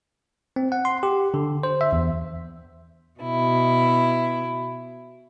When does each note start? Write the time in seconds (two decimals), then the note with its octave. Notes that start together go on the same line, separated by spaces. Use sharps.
0.56 C4
0.72 F#5
0.85 C6
1.03 G4
1.34 D3
1.63 C5
1.81 E5
1.92 E2
3.20 B2 E4